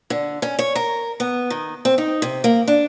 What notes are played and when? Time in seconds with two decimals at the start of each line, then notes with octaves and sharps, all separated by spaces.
0.10 D3
0.42 C#4
0.59 C#5
0.75 A#4
1.20 B3
1.50 D#3
1.85 C4
1.98 D#4
2.22 C3
2.44 A#3
2.67 D4